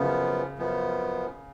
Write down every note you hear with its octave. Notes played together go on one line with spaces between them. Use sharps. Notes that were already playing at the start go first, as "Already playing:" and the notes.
Already playing: F#2 C#3 F3 B3
F#2 F3 B3